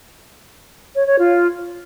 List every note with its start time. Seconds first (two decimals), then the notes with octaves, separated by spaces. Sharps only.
0.96 C#5
1.07 C#5
1.18 F4